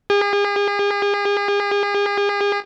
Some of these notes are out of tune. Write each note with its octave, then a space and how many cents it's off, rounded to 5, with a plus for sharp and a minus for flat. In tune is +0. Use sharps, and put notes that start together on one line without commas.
G#4 -40